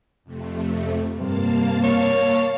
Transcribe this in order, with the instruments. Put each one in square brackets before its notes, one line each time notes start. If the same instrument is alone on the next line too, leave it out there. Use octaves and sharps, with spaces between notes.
[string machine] F2 C3 A3
[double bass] G2 C3 [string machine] A#3 F5 A5
[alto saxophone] C#5